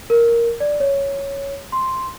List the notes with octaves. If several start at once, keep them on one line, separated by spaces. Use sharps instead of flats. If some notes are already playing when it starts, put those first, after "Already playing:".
A#4
D5
C#5
C6